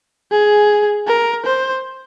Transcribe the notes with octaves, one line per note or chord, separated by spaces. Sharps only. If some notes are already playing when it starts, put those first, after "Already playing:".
G#4
A#4
C5